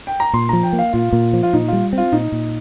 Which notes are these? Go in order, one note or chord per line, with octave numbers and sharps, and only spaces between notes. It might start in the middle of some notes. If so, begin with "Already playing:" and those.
G5
A#5
A#2 C6
F3 A#5
G5
A#3
F5
A#2 F4
A#2
F3
F4
A#2 D#4
G3 F4
C4
F4
A#2 D#4
A#2